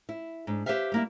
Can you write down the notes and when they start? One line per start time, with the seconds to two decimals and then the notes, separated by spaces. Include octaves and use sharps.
0.09 E4
0.47 G#2 D4
0.66 G4 B4 C5 E5 F5
0.92 G3 A#3 E4